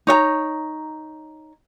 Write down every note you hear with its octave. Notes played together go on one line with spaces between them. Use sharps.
D#4 C#5 F5 A#5